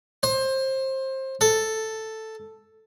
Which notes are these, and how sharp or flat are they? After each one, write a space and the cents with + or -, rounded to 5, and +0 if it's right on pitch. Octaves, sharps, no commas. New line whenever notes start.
C5 +25
A4 +0